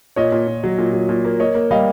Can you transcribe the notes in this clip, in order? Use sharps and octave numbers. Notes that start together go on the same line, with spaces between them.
A#2 C#5 D#5
A#2
A#2
F#3
A#2
F#3
A#2
A#3
A#3 C#5 D#5
A#3
G3 D#5 F5